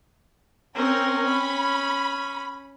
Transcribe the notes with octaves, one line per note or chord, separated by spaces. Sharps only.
C4 C#4 A#4
B5